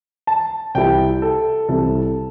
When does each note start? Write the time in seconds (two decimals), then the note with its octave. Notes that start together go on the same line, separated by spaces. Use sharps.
0.27 A5
0.75 C2 C3 G3 E4 G5
1.22 A4
1.68 C2 C3 G3 E4 A4